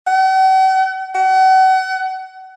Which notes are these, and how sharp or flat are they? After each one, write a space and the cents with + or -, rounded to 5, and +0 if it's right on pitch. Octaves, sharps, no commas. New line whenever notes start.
F#5 +45
F#5 +35